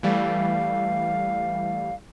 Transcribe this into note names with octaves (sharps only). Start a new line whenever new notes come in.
E3 G3 A3 F5